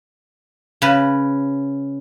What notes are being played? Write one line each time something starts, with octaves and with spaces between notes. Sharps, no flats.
C#3 B4